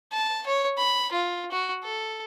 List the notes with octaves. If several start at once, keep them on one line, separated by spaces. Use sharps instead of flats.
A5
C#5
B5
F4
F#4
A4